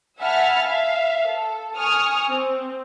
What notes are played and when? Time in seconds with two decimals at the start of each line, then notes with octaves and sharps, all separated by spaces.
0.20 E5 F#5 G#5 A5 B5 F6
0.64 E5 F5
1.28 A4
1.78 G#5 C#6 D#6 F6
2.28 C4